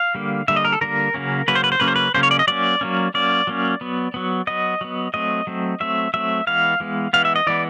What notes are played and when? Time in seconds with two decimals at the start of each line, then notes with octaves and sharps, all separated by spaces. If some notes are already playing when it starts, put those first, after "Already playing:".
Already playing: F5
0.15 D3 G3 A#3
0.48 D3 G3 A#3 E5
0.56 D#5
0.65 A#4
0.73 A4
0.81 D3 G3 A#3 A#4
1.14 C#3 F#3 A#3 C#4
1.48 C#3 F#3 A#3 C#4 B4
1.56 C5
1.64 B4
1.72 C5
1.80 C#3 F#3 A#3 C#4 B4
1.88 C5
1.96 B4
2.14 C#3 F#3 A#3 C#4 C5
2.23 C#5
2.31 D5
2.39 D#5
2.47 F#3 A#3 C#4 D5
2.81 F#3 A#3 C#4
3.14 F#3 A#3 C#4 D5
3.47 F#3 A#3 C#4
3.81 F#3 B3
4.14 F#3 B3
4.47 F#3 B3 D#5
4.81 F#3 B3
5.14 F#3 A3 C4 D#5
5.47 F#3 A3 C4
5.80 F#3 A3 C4 E5
6.14 F#3 A3 C4 E5
6.47 E3 G#3 B3 F5
6.80 E3 G#3 B3
7.13 E3 G#3 B3 F5
7.25 E5
7.36 D#5
7.47 E3 G#3 B3 D5